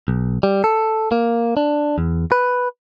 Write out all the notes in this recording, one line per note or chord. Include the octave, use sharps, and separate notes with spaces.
B1
G3
A4
A#3
D4
E2
B4